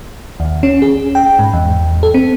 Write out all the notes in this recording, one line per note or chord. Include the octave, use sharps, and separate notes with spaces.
D#2
C#4
G#4
G5
G#2
E2
A4
C4